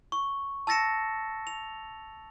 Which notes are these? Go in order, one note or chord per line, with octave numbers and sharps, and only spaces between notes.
C#6
A5 E6 A6 A#6 C#7 E7
F7